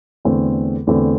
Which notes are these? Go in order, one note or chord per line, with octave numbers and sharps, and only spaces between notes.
E2 D3 A3 C4
E2 D3 A3 C4